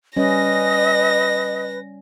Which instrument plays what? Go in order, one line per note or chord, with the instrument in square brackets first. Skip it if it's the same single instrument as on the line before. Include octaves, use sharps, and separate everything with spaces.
[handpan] G3 C#4 [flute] B4 [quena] D#5 [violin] A#6